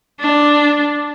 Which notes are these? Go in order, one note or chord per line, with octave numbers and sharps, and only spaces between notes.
D4